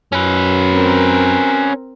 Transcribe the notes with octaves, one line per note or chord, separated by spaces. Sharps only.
F#2 C#4 B4
C4 A#4